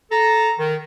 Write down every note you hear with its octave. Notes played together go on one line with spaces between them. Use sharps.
A4 A#5
D#3